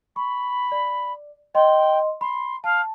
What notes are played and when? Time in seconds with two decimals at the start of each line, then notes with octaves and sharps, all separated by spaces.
0.16 B5 C#6
0.72 D5
1.55 D#5 G5 C6
2.21 B5 C6
2.64 F5 A5